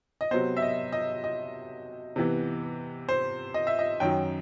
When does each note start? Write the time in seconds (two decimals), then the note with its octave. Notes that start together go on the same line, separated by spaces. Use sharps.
0.21 D#5
0.31 C3 F#3 B3 C5
0.57 E5
0.62 D#5
0.92 D#5
1.24 D#5
2.16 C3 E3 B3
3.09 C5
3.54 D#5
3.67 E5
3.79 D#5
4.00 F#2 D#3 F#3 G5